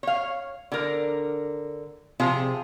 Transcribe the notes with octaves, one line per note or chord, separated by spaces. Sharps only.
C#5 F5
D3 A#4
C3 F3 F4 G#4